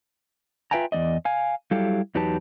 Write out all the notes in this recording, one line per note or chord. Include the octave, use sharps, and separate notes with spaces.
F4 B4 E5 G5 G#5 A#5
E2 B3 D5 D#5
F5 G#5
F#3 G3 E4 G4 A4 F5
E2 F#3 D#4 G4 B4 A5